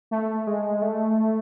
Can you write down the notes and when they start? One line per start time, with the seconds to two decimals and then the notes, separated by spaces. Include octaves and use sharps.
0.11 A3
0.47 G#3
0.82 A3